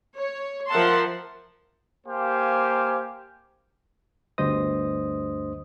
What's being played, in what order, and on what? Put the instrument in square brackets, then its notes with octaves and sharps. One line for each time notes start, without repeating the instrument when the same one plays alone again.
[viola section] C#5
F3 A#4 E5 F#5 A5 C6
[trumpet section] A#3 G4 C5 F5 G#5
[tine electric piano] G1 D2 G2 C5 D#5 D#6